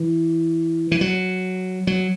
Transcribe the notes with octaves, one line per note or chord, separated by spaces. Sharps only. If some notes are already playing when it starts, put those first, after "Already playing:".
Already playing: E3
E3
F#3
F#3